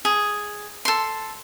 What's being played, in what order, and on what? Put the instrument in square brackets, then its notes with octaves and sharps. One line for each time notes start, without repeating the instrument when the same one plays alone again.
[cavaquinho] G#4
A4 C6